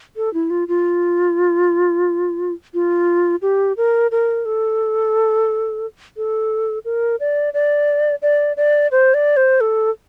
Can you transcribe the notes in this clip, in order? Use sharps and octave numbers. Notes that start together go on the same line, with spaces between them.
A4
E4
F4
F4
F4
G4
A#4
A#4
A4
A4
A#4
D5
D5
D5
D5
C5
D5
C5
A4